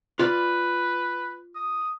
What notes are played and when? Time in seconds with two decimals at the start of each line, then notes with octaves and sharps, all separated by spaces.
0.19 F4 B4 D5 B5
1.55 D#6